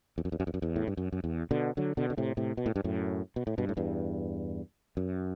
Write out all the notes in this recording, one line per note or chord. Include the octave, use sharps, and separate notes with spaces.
E2
F#2
E2
F#2
E2
F#2
E2
A2
G2
F#2
F#2
E2
B2 D3
D3 F#3
B2 D3
D3
A2 C3
A2 C3
B2
A2
G2
F#2 A2
B2
A2
G2 B2
A2
E2 G2
F#2